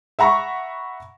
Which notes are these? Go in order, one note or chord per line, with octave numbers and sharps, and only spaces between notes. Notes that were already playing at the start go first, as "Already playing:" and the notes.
E5 F#5 A#5 B5 C#6